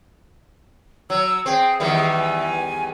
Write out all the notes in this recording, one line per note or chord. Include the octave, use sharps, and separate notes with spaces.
F#3 E6
C4 G#4 G5
E2 D#3 G3 E5
G#5